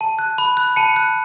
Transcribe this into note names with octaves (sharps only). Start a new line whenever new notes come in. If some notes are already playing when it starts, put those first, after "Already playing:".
A5
F#6
B5
F#6
A5 C#7
F#6